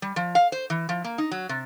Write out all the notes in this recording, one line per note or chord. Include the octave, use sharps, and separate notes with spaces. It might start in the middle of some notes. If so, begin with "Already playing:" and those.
G3
F3
F5
C5
E3
F3
A#3
D#4
F#3
C3